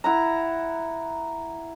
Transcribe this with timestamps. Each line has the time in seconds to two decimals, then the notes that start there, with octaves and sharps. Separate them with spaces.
0.04 E4 F#5 A#5